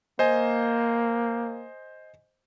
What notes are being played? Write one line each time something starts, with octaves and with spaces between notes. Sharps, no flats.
A#3 C5 D#5 G#5